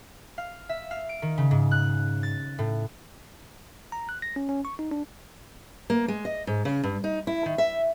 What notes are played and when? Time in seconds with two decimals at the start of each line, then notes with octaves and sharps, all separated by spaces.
0.38 F5
0.69 E5
0.91 F5
1.09 D7
1.22 D#3
1.38 C#3
1.51 G#2
1.71 F#6
2.23 A6
2.59 A2
3.92 A#5
4.09 F#6
4.22 A#6
4.36 C#4
4.49 C#4
4.65 C#6
4.79 D#4
4.91 D4
5.90 A#3
6.08 G#3
6.25 D#5
6.47 G#2
6.65 C#3
6.83 G2
7.04 D#4
7.27 E4
7.46 D#3
7.58 E5